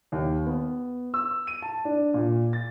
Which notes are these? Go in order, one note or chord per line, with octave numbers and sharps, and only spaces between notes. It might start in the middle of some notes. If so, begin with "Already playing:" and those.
D#2
B3
E6
D#7
A5
D4
A#2
A6